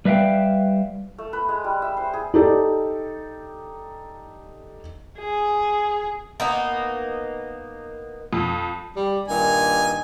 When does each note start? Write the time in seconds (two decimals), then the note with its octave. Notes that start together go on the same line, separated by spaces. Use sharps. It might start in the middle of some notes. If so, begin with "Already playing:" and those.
0.05 G3 B4 E5 F5 G5
1.18 A3
1.33 B4
1.49 G#3
1.64 G3
1.82 E5
1.97 C5
2.13 G#4
2.34 D#4 G4 A4 D5
5.19 G#4
6.40 A#3 B3 D#4
8.33 F2
8.96 G3
9.28 G2 A#2 D#3 G#5